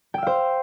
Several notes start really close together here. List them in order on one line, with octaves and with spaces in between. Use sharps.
G5 E6 F5 C5